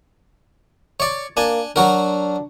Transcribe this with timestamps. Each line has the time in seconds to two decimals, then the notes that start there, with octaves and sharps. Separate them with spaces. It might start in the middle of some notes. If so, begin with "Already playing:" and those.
1.00 C#5 D5
1.37 A#3 D4 G#5
1.76 F#3 D4 F#4 A#4